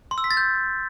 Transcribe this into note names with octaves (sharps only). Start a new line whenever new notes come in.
C6
E6
B6
A6
G6